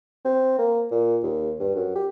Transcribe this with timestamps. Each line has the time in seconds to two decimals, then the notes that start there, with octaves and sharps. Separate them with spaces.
0.25 C4
0.59 A#3
0.91 A#2
1.23 D#2
1.60 G2
1.75 F#2
1.96 G4